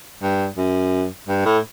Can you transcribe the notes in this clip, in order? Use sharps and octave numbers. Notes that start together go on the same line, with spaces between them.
G2
F#2
G2
A2